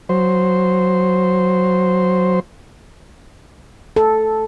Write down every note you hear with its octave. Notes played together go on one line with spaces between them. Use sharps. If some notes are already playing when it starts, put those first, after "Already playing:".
F#3 C5
A4